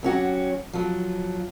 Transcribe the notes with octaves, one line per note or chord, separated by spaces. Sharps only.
F#3 C#4 F#4 G4
F3 F#3